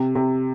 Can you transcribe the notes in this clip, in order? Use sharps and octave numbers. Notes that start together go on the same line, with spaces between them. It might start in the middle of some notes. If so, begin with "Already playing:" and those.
Already playing: C3
C3